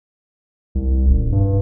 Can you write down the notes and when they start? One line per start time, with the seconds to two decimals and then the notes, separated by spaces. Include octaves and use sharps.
0.75 C2
1.08 D#1
1.32 G2